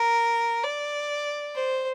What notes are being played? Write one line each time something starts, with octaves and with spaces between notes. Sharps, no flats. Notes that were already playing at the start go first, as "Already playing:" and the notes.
Already playing: A#4
D5
C5